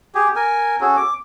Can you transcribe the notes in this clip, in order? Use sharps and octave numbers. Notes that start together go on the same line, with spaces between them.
G4 G#4
A#4 G#5
C#4 F#4 G#4 A4
D6